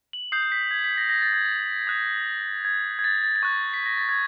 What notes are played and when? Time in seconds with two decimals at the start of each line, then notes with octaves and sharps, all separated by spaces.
0.13 F#7
0.32 D#6 G6 C7
0.43 C7
0.52 B6
0.71 G#6
0.84 B6
0.98 A#6
1.09 A#6
1.22 A6
1.33 G#6
1.45 A6
1.87 D#6 F#6
2.65 G#6
2.99 G#6
3.04 A6
3.23 A6
3.36 A6
3.43 C#6 F#6 G#6
3.74 B6
3.86 A#6
3.97 A6
4.09 G#6